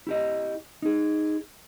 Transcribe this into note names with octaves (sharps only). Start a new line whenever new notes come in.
E4 G4 D#5
D#4 G#4